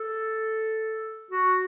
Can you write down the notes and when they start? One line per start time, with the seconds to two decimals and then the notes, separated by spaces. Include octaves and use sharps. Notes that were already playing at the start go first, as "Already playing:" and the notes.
Already playing: A4
1.31 F#4